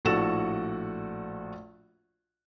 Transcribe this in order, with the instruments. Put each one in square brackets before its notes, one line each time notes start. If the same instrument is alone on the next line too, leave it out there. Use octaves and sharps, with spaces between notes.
[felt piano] A#1 A2 F#4 A4 F#5 E7